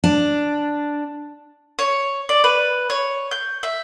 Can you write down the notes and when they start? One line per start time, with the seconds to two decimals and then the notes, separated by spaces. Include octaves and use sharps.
0.04 D4
1.79 C#5
2.29 D5
2.44 B4
2.90 C#5
3.31 G6
3.63 E5